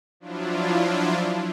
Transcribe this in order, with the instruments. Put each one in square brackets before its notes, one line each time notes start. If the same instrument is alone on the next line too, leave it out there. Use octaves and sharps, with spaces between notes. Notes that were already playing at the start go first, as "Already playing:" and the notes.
[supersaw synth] F3 F#3 D4 E4 F4